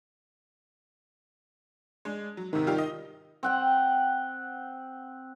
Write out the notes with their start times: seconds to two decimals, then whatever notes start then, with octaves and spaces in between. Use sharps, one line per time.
2.05 G#3 D4
2.37 F#3
2.53 G#2 C3 D#3
2.67 G3 F4 G4
2.78 D#5
3.43 C4 F#5 G5